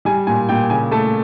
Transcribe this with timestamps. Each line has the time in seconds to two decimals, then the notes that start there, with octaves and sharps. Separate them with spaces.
0.05 G3 G#5
0.27 A#2 G#5
0.49 A#2 G5
0.70 C#3 G#5
0.92 A3 A5